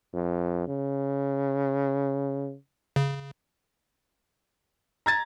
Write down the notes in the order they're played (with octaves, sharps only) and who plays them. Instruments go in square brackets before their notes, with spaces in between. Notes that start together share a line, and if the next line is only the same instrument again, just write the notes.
[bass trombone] F2
C#3
[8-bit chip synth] C#3
[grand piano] A#5 G#6 A6